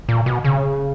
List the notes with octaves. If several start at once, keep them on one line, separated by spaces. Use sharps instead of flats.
A#2
B2
C#3